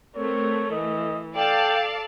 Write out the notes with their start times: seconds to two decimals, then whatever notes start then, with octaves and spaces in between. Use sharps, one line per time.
0.16 A3 C4 A#4 C#5
0.71 E3 D#5
1.37 A4 D5 F5 G5 A5